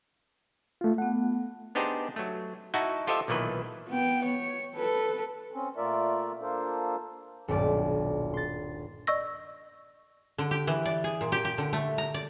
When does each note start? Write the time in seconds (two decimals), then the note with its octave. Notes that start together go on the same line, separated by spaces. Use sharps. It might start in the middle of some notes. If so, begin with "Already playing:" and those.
0.81 A3 F4
0.98 A3 B3 F#5
1.75 B3 D4 D#4 G4 G#4 C5
2.16 F#3 A3
2.74 D#4 E4 F#4 E5 F#5 A5
3.07 F4 G4 A4 C5 D#5 E5
3.28 B1 A#2 D#3 E3 B4
3.89 B3 G5
4.25 C#5
4.76 A4 B4
5.53 C4 C#4
5.77 A#2 A3 F4 A#4 D5 E5
6.41 A#3 D4 F4 A4 A#4 C5
7.48 D#1 B1 G2 D5
8.34 C6 A6
9.07 D5 D#5 C#6 E6 A#6
10.38 D3
10.51 G4
10.67 E3
10.85 D5
11.04 G#4
11.21 A#2
11.32 G4
11.45 G4
11.58 D3
11.73 A3
11.98 A#5
12.14 D5